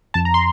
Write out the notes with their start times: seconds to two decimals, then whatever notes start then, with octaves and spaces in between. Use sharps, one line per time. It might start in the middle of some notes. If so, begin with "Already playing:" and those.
0.14 F2 A5
0.25 A#5
0.34 C6